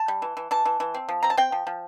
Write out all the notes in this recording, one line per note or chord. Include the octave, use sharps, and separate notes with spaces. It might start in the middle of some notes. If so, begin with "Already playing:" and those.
Already playing: A5
G3
E3
E3
E3 A5
E3
E3
C4
F3
C4 A#5
A5
C4 G5
F3
F3